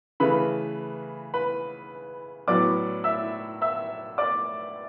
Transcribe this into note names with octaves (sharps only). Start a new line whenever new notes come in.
C#3 E3 A3 B4 B5
B4 B5
A2 F#3 B3 D5 D6
E5 E6
E5 E6
D5 D6